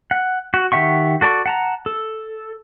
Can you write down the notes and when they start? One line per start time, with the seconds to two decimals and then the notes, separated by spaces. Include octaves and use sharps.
0.11 F#5
0.54 F#4
0.72 D#3 G4 E5 F#5 C#6
1.21 F#4 A4 D5 A5 C#6
1.46 F#5 A5 A#5
1.86 A4